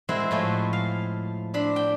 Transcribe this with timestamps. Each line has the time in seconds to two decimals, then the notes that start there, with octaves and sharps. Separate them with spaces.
0.09 G#3 C4 E4 C5 F#5
0.31 A2 F3 G#3 A3 F#4
0.73 F5
1.54 C4 D4 B5
1.76 G5